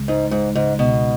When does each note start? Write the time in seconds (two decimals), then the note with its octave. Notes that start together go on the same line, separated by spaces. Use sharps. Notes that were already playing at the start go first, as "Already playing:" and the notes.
Already playing: C#2 C#3 G#3
0.08 G#2 D#4
0.31 G#2 G#3
0.55 G#2 C#3
0.79 C#2 B2